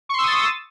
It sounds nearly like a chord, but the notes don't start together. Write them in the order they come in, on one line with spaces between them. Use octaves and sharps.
C#6 C6 E6 D#6 A6